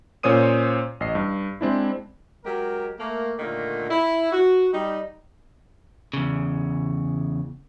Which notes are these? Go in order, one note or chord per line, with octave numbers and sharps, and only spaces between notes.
A#2 C#4 C5 C#5 D#6 D#7
A1 D#5 C7
G2
G#3 C4 D4 E4
F#3 G#3 G4 A#4
A3 A#3
A#2 D3 D#3 A3 A#3
E4
F#4
G3 D#4
E2 C#3